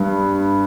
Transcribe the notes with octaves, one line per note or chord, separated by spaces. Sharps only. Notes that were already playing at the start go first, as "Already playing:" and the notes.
Already playing: G2